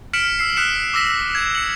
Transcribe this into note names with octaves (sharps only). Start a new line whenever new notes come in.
F6 B6 C#7 D7 E7 F#7
E6 C7
D#6 F6 F#6 B6 C#7 E7
D6 E6 A#6 B6
G#6
C#7 F#7